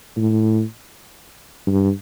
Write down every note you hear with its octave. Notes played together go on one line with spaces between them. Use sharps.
A2
G2